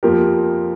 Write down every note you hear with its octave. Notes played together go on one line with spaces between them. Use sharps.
F2 F3 A#3 G4 A#4